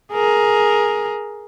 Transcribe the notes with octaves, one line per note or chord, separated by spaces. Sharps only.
G#4 A#4